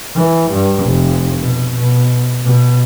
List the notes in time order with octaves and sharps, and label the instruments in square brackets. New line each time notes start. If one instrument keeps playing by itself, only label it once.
[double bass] E3
G2
F1
B2
B2
B2